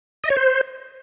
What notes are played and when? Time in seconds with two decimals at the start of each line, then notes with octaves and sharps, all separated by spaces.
0.24 D#5
0.30 C#5
0.37 C5